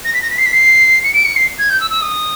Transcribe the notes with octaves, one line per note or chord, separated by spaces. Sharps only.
A#6
B6
A#6
B6
C7
B6
C7
C#7
D7
C#7
C7
G#6
G6
E6
E6
D#6